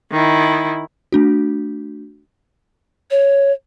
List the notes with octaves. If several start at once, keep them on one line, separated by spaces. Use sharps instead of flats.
D#3 E4
A3 D4 F#4
C#5